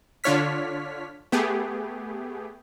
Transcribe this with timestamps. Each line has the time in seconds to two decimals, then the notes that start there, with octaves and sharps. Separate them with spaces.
0.24 D3 D4 F4 C#5 F6 B6
1.32 A3 B3 G4 G#4